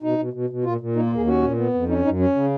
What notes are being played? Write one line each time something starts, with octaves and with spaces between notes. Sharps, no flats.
B2 D#4
B2
B2
B2
A#2 F4
A#2
A#3 D#4
F4
D#2 G#4
C#4 F#4
A#2
B3
F2
C#4 D#4
F#2 D#4
C#4
C#3